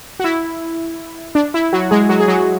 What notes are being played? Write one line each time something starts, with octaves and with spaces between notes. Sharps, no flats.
F#4
E4
D4
E4
F#3 F#4
G#3 G#4
F#3 F#4
G#4
F#3 F#4